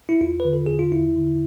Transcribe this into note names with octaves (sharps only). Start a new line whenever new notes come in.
E4
E2 F4
D3 B4
A4
E2 G#4
F4
E2 E4
D3